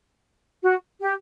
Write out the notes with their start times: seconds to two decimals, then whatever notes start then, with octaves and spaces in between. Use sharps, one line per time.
0.63 F#4
1.01 G4